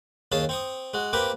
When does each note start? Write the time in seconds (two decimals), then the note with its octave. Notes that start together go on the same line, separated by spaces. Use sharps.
0.32 D#2 C#4 G#4 F5 A5
0.49 C4 C#6 D#6
0.94 G#3 F#4
1.13 A#3 C4 G4 A#4 B4